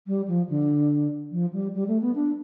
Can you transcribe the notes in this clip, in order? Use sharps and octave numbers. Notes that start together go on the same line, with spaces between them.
G3
F3
D3
F3
G3
G3
A3
B3
D4